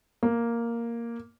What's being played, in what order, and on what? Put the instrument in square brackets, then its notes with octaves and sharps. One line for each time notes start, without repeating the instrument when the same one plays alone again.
[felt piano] A#3